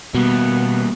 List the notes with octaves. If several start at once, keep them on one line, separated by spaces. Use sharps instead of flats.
B2 G3 A#3 B3